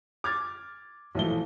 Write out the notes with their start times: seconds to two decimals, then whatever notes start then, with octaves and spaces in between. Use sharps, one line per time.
0.24 D6 F6 G#6 A6
1.15 B1 A#2 E3 F3 A3 G7